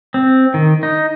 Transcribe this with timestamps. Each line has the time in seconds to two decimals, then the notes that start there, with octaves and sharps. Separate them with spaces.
0.14 C4
0.54 D#3
0.83 D#4